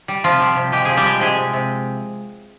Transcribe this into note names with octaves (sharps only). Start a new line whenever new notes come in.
G3
C3 F3 F4
G3
C3
G#3 G4
F3 G#4
G3 G4
G#3
C3 G#3 G#4
C3
C3